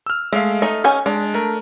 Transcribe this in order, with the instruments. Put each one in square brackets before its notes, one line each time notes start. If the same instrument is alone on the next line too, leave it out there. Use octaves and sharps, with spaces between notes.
[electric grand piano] E6 F6
[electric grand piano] G#3 A3 F5 [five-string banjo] E5
[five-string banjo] A3 D#4 [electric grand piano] D#5
[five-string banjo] C#4 G5 G#5
[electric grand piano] G#3 [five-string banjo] D4
[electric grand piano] A3 A#4